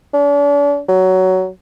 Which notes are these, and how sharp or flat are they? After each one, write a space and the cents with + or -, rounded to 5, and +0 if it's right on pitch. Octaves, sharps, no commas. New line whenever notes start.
D4 -40
F#3 +15